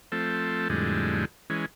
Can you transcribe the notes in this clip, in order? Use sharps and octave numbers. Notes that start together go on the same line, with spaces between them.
F3 A3 C4 A4
F2 A2 D3 G3 G#3
E3 G#3 C#4